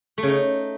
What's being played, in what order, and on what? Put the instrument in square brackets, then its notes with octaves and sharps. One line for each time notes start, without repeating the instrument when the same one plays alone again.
[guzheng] A3
C#3
D#4